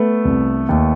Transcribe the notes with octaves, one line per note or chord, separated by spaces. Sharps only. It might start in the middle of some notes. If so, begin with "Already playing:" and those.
Already playing: A3 B3
C2
D#2